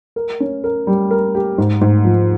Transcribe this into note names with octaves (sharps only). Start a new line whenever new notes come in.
A#4
C#4
A#4
G3
A#4
G4
G#2
G#2
F3